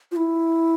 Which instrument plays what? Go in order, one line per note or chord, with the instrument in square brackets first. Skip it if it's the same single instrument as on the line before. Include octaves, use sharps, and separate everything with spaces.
[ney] F4
E4